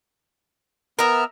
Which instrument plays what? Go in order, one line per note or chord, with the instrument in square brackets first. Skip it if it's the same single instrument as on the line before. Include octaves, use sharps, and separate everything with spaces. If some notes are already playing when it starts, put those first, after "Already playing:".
[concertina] B3 F6 [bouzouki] A#4 E5